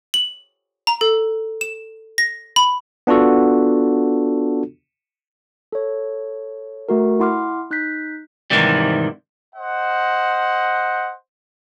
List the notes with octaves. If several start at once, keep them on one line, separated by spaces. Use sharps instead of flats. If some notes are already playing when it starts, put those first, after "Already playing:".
F#7
A#5
A4
E7
A#6
B5
B3 D4 F4 F#4 A4
A4 C#5
A3 F#4 A#4
E4 F#5 C6 D6 F6
D#4 F#6 G6 B6
G#2 C3 D#3 E3 G3
C5 D#5 F#5